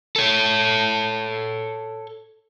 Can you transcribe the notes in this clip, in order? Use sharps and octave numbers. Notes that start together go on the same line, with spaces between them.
A4 C#5